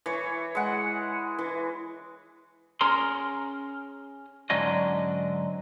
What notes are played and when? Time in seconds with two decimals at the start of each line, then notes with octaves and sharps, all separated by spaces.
0.06 E3 C#5
0.55 G#3 F#5
1.39 E3
2.81 C#4 G#4 A#4 A#5 C6
4.50 G#2 D3 F#3 C#4 D4 D#5